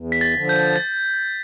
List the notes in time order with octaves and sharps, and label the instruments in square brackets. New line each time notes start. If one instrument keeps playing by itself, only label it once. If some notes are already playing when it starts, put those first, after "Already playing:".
Already playing: [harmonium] E2
[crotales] B6
A6
[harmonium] D3 F3
[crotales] G6
A6